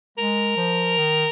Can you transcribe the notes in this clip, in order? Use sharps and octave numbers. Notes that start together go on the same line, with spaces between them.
G#3 A#4
F3
D#3